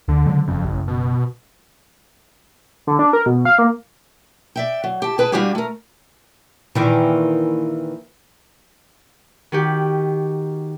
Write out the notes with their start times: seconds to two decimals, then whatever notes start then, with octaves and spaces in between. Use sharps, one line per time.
0.08 D2 D3
0.26 C#3 F#3 G#3
0.48 F#1 F2 C#3
0.65 A1
0.88 B2
2.87 D3
2.99 D4
3.13 A#4
3.26 B2
3.45 F5
3.58 A#3
4.56 D5 E5 G5
4.84 F#3
5.02 G4 A5
5.18 G#4 B4 G5 A5
5.32 G3 D4 F#4 G4 F5 G#5
5.55 A3 A#4
6.75 A#2 D#3 E3
9.52 D#3 F#4 G4